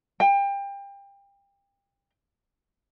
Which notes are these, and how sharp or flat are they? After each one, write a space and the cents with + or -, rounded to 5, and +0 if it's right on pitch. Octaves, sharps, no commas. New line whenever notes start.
G5 +30